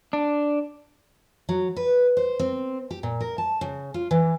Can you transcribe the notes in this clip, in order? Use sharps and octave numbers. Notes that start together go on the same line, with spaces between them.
D4
F#3
B4
C5
C4
G4
A#2
A#4
A5
C#3
F4
E3